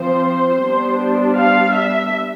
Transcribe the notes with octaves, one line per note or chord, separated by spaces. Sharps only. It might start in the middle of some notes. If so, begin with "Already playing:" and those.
Already playing: F3 C4 C5
G3 B3 D4
F5
E5